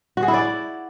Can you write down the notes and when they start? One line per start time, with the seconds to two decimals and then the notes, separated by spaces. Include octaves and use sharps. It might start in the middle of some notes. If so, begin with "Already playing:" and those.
0.17 F#4
0.23 G#4
0.28 E4
0.34 D5